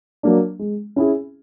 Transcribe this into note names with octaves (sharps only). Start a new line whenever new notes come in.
F#3 A#3 D4
G#3
C#4 E4 G#4